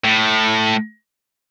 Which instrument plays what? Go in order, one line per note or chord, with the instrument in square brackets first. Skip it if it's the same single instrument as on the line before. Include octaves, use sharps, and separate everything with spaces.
[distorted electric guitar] A2